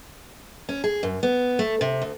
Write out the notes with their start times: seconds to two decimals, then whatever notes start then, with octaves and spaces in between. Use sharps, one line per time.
0.69 C#4
0.84 G#4
1.03 F#2
1.23 B3
1.59 A3
1.81 C3
2.02 D2